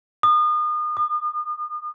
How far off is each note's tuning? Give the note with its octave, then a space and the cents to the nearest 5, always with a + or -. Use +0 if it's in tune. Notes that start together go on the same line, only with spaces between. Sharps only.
D#6 -35
D#6 -45